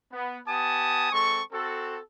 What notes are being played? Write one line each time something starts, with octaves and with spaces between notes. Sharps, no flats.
B3
B3 G4 G#5 A5 D#6
G#3 C4 A4 C#6
C4 F#4 A4